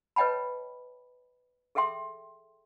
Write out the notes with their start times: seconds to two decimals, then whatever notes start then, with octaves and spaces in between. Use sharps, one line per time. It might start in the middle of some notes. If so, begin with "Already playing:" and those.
0.16 B4 C#5 D#5 G5 A5 B5
1.75 G#4 A4 E5 G5 C6